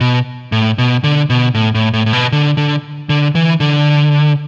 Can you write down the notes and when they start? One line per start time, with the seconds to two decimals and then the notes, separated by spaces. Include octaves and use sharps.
0.01 B2
0.52 A2
0.78 B2
1.04 D3
1.30 B2
1.55 A2
1.75 A2
1.94 A2
2.06 A2
2.13 B2
2.32 D3
2.57 D3
3.09 D3
3.35 E3
3.60 D3